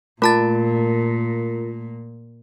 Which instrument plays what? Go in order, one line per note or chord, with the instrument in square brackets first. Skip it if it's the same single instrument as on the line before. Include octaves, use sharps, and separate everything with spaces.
[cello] A#2 [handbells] A3 A5 A6 [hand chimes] F4 A#4